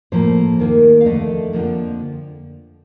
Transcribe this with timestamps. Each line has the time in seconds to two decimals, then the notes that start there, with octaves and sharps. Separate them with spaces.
0.12 A2 F3 A#3 C5
0.59 D#2 D#3 A#3
1.01 F5
1.06 F2 D3 A3 D#5
1.53 F2 D3 F3 A#3